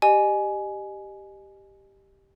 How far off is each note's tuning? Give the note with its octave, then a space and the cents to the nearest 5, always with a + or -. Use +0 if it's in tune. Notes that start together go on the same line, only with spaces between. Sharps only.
G4 +0 D#5 -30 G#5 +15